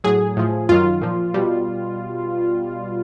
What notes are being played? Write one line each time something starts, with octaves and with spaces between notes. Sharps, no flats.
A2 F#3 G#4
A2 F3
F#2 D#3 F#3 F4
A#2 F3
B2 G3